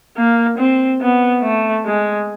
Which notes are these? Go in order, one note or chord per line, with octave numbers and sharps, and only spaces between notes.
A#3
C4
B3
A3
G#3